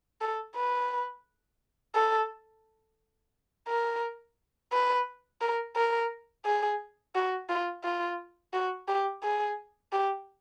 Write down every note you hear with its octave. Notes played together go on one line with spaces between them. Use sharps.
A4
B4
A4
A#4
B4
A#4
A#4
G#4
F#4
F4
F4
F#4
G4
G#4
G4